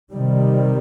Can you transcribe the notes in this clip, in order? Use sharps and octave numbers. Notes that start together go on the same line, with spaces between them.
C3 D#3 G3